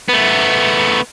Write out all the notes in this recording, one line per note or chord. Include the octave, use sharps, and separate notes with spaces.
A3 B3